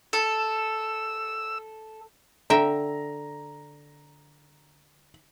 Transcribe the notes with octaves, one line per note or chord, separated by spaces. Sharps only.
A4 E6
D3 E5 G5 A#5